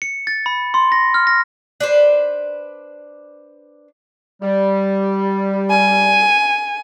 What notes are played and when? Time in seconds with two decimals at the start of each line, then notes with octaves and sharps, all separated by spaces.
0.02 C#7
0.27 A6
0.46 B5
0.74 C6
0.92 A#6
1.14 F6
1.27 A#6
1.80 D4 B4 C5
4.42 G3
5.70 G#5